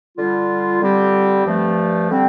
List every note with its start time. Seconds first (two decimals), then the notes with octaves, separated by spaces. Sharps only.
0.17 D3 G3 F4
0.81 D3 G3 C4 G4
1.44 G2 F3 A3
2.09 D3 G3 C4 G4